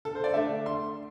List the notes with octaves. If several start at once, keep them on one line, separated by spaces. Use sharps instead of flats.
A4
C5
D5
D3 A3 D4 E5
C6